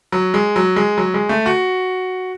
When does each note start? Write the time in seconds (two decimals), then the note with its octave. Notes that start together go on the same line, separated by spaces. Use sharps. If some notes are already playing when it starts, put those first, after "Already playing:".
0.12 F#3
0.34 G#3
0.56 F#3
0.76 G#3
0.98 F#3
1.14 G#3
1.29 A3
1.46 F#4